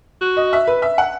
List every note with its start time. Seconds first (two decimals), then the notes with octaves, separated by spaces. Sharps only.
0.21 F#4
0.37 D#5
0.53 E5
0.67 B4
0.82 E5
0.98 F#5